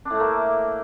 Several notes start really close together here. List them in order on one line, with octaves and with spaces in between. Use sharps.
D4 A2 A3 A#3